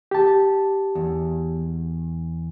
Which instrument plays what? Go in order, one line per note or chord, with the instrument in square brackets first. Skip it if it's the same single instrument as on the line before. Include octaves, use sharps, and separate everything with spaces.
[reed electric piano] G4 A5
[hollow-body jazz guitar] E2